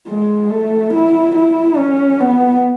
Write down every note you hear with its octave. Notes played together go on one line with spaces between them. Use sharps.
G#3
A3
E4
E4
C#4
B3